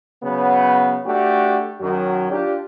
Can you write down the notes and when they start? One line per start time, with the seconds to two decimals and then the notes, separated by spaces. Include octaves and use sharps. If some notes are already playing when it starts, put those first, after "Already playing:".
0.23 C#3 F#3 B3
1.06 A3 D4 F#4 G4
1.81 F#2 D#3 F#3
2.31 D4 F4 G4